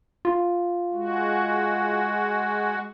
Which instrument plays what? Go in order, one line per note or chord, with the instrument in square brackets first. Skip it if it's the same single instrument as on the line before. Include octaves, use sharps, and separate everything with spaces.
[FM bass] F4
[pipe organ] G#3 F#4